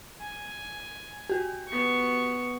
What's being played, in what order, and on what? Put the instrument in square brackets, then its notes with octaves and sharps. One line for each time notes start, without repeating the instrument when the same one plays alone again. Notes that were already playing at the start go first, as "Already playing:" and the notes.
[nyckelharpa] G#5
[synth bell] F#4 G4
[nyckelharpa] B3 C#6